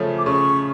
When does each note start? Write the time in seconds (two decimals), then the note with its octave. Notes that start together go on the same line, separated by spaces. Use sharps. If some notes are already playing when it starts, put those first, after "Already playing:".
Already playing: C#3 F3 A3 C#4
0.18 D6
0.26 C#3 C#6